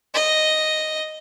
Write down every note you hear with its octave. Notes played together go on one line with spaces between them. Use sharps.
D#5